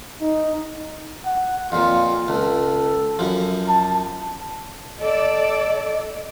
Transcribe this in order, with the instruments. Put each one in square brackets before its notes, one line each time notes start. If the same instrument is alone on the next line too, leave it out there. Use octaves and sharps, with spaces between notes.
[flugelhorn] D#4
[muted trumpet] F#5
[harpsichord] F2 A#2 [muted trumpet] F4
[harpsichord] C#2 [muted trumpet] A4
[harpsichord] F#2 F3
[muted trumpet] A5
[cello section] A4 D5 [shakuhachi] D#5